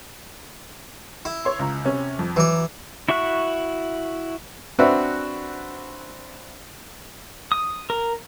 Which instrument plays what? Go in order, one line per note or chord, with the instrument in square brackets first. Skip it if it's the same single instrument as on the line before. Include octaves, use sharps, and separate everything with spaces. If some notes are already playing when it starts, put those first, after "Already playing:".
[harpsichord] E4
[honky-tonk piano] C#5 C6
C#2 A#5
C3 C#4
F2
[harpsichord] E3 D5 [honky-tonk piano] F#3
[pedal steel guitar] E4 F#4 E5 C#6 F#6
[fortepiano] C4 D4 F#4 B4 E5
[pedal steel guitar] D#6
A#4